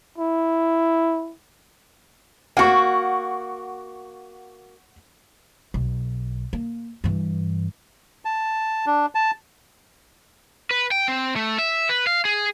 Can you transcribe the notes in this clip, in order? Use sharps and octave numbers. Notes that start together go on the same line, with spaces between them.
E4
A#3 F#4 F#5 C#6
B1
A#3
G2 E3
A5
D4
A5
B4
G5
C4
A3
E5
B4
F5
G#4